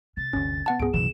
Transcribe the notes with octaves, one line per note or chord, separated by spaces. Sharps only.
C3 A6
G1 D2 C#4
B3 F#5 A5
C#2 G#2 B3 G#4 D7
C2 F#2 B2 E3 F#3 E7